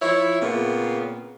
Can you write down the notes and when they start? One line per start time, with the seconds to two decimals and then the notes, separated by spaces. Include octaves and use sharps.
0.02 F3 E4 C#5
0.42 A#2 C#3 B3 C4